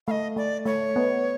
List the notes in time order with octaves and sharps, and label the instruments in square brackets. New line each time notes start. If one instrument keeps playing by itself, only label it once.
[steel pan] A3 [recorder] D#5 F5
[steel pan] A3 [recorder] D5
[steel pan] A3 [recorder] C#5
[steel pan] B3